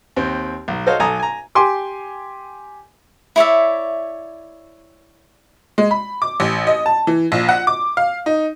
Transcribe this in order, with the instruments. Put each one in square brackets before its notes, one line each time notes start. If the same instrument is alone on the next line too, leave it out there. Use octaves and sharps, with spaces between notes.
[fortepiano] D#2 C4
B1
F#4 A4 C5 C#5 D#5 F5
B1 A4 G#5 A#5 D#6
G#5 A#5
[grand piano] G4 G#5 C6 D6
[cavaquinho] E4 C#5 D5 E5
[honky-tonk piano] G#3
B5
D6
A1
D#5
A5
E3
A#1
F#5
D6
F5
D#4